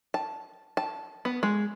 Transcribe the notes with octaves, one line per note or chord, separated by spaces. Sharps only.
A5
A5
B3
G#3